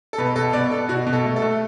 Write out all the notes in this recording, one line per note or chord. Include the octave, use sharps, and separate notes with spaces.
A4
B2 B4
B2 A4
B3 D5
B3 A4
B2 F#4
B2
A4
A3
A4
A3